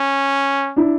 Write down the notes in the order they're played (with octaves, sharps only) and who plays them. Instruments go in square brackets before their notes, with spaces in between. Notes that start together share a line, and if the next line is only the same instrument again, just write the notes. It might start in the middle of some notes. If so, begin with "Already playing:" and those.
Already playing: [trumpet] C#4
[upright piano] D4 E4